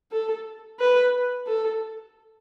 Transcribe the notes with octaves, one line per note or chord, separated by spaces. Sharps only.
A4
B4
A4